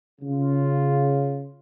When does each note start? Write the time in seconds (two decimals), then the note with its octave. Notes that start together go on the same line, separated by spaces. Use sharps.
0.20 C#3 F4